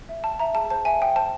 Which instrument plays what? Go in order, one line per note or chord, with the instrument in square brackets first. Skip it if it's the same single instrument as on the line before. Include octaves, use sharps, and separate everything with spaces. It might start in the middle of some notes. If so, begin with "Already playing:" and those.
[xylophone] E5
G5 A5
E5 A#5
G#4 A5
C5 A5
E5 G#5
E5 G5
C5 A5